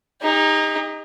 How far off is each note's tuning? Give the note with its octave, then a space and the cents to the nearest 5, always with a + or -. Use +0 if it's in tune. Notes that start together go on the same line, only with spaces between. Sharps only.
D#4 +0 G4 +45